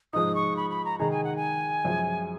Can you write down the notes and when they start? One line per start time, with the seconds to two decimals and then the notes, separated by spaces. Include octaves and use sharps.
0.13 G#2 F3 G#3 D#4 D#6
0.35 C#6
0.57 B5
0.70 B5
0.85 A#5
0.99 D#3 G#3 D#4 G#4 A#5
1.11 G#5
1.24 F#5
1.36 G#5
1.85 F#2 F3 G#3